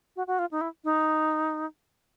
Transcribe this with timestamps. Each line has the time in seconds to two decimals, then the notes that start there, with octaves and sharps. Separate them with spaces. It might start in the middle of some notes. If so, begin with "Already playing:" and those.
0.16 F#4
0.27 F#4
0.39 F4
0.51 D#4
0.61 E4
0.84 D#4